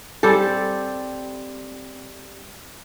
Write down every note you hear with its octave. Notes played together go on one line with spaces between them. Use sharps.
G3 C4 G4 A4